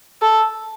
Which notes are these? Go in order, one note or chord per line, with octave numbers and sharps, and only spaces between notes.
A4